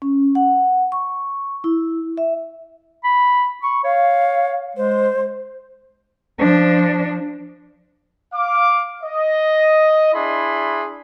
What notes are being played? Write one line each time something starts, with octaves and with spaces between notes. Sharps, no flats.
C#4
F#5
C#6
E4
E5
B5
B5 C#6
C#5 F5
G#3 C5
F3 D4
F5 D6
D#5
D4 E4 G#4 B5 C6